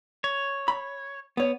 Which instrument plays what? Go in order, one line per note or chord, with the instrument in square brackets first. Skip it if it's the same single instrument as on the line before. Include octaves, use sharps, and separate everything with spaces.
[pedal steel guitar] C#5
[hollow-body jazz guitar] B5
B3 C#5